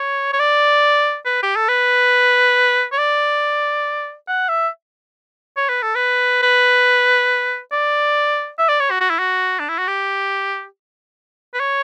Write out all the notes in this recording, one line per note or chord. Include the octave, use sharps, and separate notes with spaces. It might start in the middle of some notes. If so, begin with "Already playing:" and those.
Already playing: C#5
C#5
D5
B4
G4
A4
B4
C#5
D5
F#5
E5
C#5
B4
A4
B4
B4
D5
E5
D5
C#5
F#4
F#4
E4
F#4
D4
E4
F#4
G4
B4
C#5